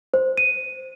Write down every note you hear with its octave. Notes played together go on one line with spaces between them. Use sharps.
C5
D#7